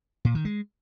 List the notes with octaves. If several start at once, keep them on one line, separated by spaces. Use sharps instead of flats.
A#2
D#3
G#3